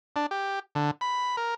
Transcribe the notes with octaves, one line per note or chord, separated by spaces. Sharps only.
D4
G4
D3
B5
A#4